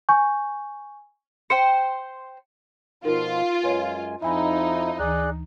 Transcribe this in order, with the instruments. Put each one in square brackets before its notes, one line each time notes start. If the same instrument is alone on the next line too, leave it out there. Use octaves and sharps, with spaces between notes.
[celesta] G#5 C#6 G6
[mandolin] C5 G5 [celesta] C#7
[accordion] B2 F3 [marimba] D#4 A#4 [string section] F4
[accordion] F#2 G#3 G#5 [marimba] B4 C#5
[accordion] F2 F3 E4 [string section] D#4 [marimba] E5 G#5 B5
[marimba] D2 E3 [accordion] G#4 D5 F#6